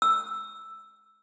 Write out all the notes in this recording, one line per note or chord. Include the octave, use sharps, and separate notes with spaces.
E6